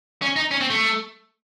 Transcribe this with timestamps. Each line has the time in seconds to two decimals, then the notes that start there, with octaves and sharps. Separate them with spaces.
0.22 C#4
0.36 D#4
0.51 C#4
0.61 C4
0.70 A3